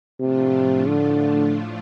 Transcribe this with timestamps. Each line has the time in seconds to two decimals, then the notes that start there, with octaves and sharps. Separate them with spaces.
0.20 A2 C3 F3 A3 D4 F4
0.88 D3